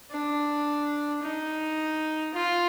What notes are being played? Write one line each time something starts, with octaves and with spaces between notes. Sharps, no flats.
D4
D#4
F4